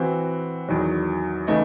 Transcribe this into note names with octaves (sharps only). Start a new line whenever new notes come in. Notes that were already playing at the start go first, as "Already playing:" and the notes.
Already playing: E3 C4 F#4
E2 D#3 F#3
C#3 E3 A3 D#4